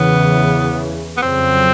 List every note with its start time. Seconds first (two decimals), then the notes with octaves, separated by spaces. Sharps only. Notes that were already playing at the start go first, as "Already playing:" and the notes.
Already playing: E2 C#3 E3 B3
1.17 B3
1.21 F2 C#3 F#3 C4